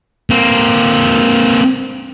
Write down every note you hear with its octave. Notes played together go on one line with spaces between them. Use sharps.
A#3 C4